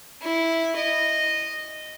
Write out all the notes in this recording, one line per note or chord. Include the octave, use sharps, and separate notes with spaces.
E4
D#5